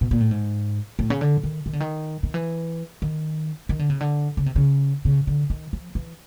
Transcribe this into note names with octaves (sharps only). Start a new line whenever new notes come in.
B2
A#2
A2
G#2
A2
C#3
D3
D#3
D#3
D3
D#3
D#3
E3
D#3
D#3
D3
C#3
D3
C#3
C3
C#3
C#3
D3
D#3
F3
E3